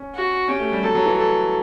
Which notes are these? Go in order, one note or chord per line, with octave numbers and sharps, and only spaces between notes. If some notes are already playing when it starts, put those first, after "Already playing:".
Already playing: C#4
F#4
C#4 G4
A3
G3
F#3 A4
F#3
E3
A4